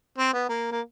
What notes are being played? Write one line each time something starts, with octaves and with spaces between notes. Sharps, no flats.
C4
B3
A#3
A#3